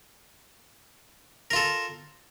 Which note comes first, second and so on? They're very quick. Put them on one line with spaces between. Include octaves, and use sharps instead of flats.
A#4 F4 A4